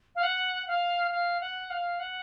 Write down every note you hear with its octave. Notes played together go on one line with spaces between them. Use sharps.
F5
F#5
F5
F5
F#5
F5
F#5